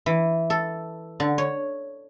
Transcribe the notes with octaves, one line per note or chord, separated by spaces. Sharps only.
E3
A4
D3
C#5